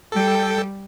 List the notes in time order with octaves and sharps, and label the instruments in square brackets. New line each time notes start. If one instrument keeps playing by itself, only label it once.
[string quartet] G3 [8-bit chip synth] A4 G5